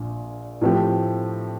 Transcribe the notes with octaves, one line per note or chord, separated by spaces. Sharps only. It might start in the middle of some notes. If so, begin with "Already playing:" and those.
Already playing: A#1 A#2
A2 F3 A3 C4 G4